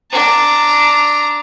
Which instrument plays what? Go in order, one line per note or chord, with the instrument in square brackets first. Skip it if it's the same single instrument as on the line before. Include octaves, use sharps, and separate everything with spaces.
[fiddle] D4 A#5